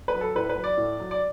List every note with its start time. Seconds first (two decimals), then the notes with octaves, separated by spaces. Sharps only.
0.08 B4
0.15 F#3
0.21 A4
0.35 A2 B4
0.49 B4
0.57 F#3
0.64 D5
0.77 A2
1.00 F#3
1.11 D5